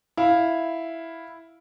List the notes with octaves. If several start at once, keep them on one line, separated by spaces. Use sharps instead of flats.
E4 F5